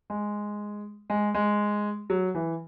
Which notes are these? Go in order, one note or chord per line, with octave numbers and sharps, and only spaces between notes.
G#3
G#3
G#3
F#3
E3